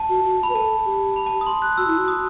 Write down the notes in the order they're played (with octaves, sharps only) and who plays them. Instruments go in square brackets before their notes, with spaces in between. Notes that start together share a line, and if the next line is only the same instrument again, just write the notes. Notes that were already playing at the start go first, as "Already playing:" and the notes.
Already playing: [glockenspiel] A5
[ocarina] F#4
F#4
[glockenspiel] B5
[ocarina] B4
[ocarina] A4 [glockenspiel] A5
[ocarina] G4
[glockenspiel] B5
A5
D#6
C6
F#6
[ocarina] F#4 [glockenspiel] E6
[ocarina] E4
F#4
[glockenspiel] D#6